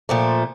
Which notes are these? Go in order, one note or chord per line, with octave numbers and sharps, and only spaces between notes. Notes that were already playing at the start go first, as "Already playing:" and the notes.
A#2 F3 A3